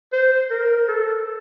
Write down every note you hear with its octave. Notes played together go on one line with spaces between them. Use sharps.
C5
A#4
A4